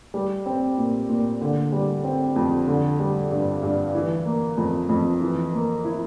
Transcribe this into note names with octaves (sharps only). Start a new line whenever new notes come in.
G3
C4
A#2
A#2
D3
G3
C4
F2
D3
G3
G2
G2
E3
A#3
F2
F2
E3
A#3
E4